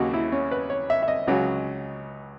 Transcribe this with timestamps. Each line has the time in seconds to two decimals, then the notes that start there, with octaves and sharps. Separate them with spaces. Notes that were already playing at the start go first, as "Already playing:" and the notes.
Already playing: D#2 C#3 F#3 D#4 F#4
0.14 E4
0.32 C#4
0.51 B4
0.70 C#5
0.90 E5
1.03 E5
1.08 D#5
1.27 C#2 C#3 F#3